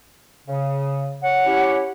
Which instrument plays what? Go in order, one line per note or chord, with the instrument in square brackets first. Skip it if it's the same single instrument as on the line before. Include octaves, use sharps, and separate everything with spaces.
[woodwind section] C#3
[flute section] C#5 F#5
[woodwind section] C#4 E4 G4